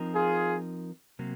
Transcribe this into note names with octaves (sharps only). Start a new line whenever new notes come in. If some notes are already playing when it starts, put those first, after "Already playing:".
Already playing: F3 C4 D#4 A#4
F4 G#4
C3 F#3 A#3